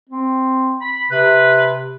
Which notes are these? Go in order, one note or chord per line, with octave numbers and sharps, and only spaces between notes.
C4
B5
C3 B4